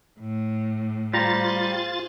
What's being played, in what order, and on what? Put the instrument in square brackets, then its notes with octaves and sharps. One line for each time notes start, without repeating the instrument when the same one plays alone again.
[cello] A2
[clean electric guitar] G3 A#5 [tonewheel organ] F4 A6 [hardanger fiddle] G#4 C5